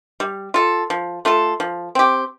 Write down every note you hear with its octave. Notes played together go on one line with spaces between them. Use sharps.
G3
F4 A4
F3
A3 F4 A4
F3
C4 G4